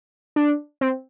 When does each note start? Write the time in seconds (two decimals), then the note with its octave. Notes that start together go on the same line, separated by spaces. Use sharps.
0.36 D4
0.81 C4